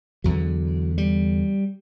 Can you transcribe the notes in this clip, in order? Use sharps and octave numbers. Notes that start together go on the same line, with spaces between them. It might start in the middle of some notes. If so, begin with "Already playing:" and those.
E2 D3 F#3
G3